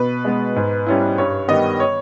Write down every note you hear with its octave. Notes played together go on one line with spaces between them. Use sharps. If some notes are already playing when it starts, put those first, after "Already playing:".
Already playing: B2 B4
G#3 B3
G#2
G3 C#4 E4
G2 C#5
D#3 G3 B3 D#5
C#5